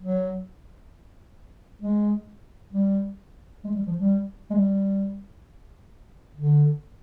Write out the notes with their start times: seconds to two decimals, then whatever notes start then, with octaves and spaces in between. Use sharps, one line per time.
0.01 F#3
1.82 G#3
2.73 G3
3.64 G#3
3.75 G3
3.87 F3
3.98 G3
4.50 G#3
4.55 G3
6.37 D3